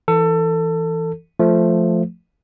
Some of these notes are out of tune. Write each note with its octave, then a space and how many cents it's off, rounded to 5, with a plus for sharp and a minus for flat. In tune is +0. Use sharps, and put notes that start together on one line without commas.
E3 +0 A4 +25
F3 +0 A3 +0